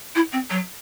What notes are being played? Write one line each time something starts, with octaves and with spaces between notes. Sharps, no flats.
E4
C4
F#3